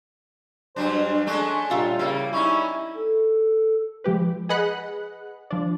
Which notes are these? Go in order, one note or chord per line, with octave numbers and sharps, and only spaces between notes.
G2 F#3 D4 C5
G#3 A3 C#4 D4
A#2 G3 F4 C#5 E5
C#3 G3 A#3 E4
C#4 D#4 E4 C#5
A4
F3 G#3 G4 B4
G#4 B4 D#5 F#5 B5 F#6
F3 D4